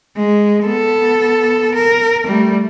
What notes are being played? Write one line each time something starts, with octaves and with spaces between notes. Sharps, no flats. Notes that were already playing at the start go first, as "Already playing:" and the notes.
G#3
B3 A4
A#4
G3 A3